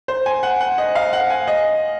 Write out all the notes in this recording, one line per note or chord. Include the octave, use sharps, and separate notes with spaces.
C5
G#5
F#5
F#5
D#5
F5
F#5
G#5
D#5